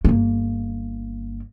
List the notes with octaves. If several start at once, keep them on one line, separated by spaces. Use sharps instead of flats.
G1 A#3